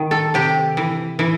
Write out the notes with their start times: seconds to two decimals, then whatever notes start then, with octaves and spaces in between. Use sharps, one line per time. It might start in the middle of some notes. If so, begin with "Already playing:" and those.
Already playing: D#3
0.11 A4
0.34 C3 G4
0.77 E3
1.19 E3